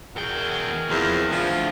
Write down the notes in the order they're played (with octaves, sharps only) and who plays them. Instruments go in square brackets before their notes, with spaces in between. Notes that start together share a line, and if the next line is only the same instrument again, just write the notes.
[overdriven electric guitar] E2 G5 [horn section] F#4 G#4 A#4
[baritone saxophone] E2 [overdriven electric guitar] F3 C4
[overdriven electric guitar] D2 [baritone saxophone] F3